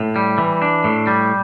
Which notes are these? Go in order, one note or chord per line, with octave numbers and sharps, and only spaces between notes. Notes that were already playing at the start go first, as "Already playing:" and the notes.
Already playing: A2
G3
E3
D4
A2
G3